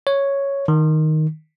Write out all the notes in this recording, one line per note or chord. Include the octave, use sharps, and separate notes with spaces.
C#5
D#3